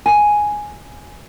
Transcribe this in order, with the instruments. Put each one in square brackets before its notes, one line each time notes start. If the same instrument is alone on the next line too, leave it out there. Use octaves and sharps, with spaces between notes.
[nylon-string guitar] G#5